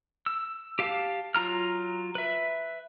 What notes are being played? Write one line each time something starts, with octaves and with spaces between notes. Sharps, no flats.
E6
G4 F5 A5
F#3 F4 A#5 F6
B4 E5